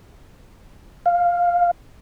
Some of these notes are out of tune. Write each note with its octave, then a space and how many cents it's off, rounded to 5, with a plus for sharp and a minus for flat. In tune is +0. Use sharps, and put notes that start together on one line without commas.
F5 +5